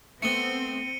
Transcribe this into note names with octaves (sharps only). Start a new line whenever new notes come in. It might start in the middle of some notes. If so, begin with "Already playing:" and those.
A3 B3 C4 C#7 D#7 G7